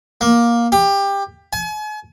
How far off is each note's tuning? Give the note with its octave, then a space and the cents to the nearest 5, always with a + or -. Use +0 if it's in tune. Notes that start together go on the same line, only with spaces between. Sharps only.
A#3 +15
G4 +20
G#5 +40